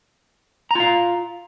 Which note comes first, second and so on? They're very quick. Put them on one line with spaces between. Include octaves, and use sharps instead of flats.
A#5 F4 F5